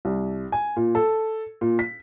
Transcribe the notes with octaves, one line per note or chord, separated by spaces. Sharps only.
C2
G#5
A#2
A4
A#2
B6